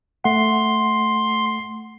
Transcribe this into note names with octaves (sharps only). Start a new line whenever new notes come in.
A3 F#5 C6